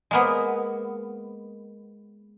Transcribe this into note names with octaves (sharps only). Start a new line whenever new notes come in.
G#3 A#3 B3